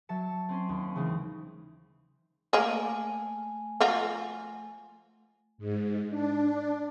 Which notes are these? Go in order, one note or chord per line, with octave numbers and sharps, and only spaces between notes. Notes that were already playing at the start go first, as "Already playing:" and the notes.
F#3 E5 A5 C#7
C4 C#4 C6
D#2
C#3 E3 G#3 C4
A3 A#3 G#4 G#5
F3 F4 F#4
G#2
D4